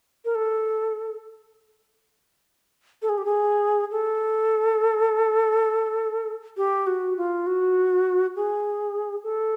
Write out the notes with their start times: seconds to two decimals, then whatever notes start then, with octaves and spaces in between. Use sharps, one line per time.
0.25 A#4
0.35 A4
3.02 A4
3.09 G#4
3.18 G4
3.25 G#4
3.91 A4
6.57 G4
6.87 F#4
7.17 F4
7.47 F#4
8.36 G#4
9.24 A4